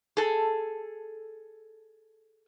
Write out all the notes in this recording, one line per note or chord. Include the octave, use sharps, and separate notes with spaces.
G#4 A4